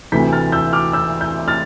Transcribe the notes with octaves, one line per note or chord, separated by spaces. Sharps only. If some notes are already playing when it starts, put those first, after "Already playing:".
D2 C3 E3 G6 B6
F6 A6
E6 G6
D6 F6
E6 G6
E6 G6
F6 A6